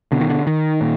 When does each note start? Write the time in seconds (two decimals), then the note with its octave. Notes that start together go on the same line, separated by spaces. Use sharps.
0.12 B2 D3
0.21 D#3
0.29 D3
0.47 D#3
0.81 A#2